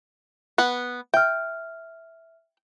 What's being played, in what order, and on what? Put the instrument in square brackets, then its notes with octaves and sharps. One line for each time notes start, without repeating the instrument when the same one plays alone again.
[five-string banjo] B3 F#5
[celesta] E5 F6 [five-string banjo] G5